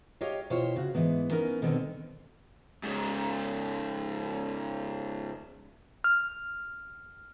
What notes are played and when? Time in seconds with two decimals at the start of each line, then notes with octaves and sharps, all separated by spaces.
0.21 G4 C#5 D#5 F5
0.50 B2 E4 F4 G4 C5 C#5
0.76 C#3 F#4
0.94 G#2 E3 B3
1.30 B3 C#4 D#4 A#4
1.62 B2 D3 D#3 B3 C4
2.83 G#2 C#3
6.04 F6